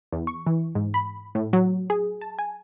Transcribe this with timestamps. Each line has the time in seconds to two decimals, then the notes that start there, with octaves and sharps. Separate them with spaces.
0.12 E2
0.27 C#6
0.47 E3
0.75 G#2
0.94 B5
1.35 A2
1.53 F#3
1.90 G#4
2.21 A5
2.39 G#5